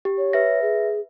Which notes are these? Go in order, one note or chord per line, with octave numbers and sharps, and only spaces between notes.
G4
C#5
B4 E5 A#6
G#4